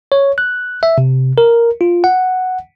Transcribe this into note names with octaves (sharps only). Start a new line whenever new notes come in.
C#5
F#6
E5
C3
A#4
F4
F#5